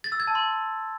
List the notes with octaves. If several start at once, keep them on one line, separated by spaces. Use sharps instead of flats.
A6
E6
G#6
A5
C6